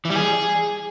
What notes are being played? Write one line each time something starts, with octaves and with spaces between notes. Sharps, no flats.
E3
G3
G#4